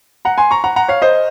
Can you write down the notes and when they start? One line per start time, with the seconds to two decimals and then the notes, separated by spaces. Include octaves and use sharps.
0.25 F#5 A#5
0.38 G#5 C6
0.51 A#5 C#6
0.64 F#5 A#5
0.76 F#5 A#5
0.88 C#5 F5
1.02 C5 D#5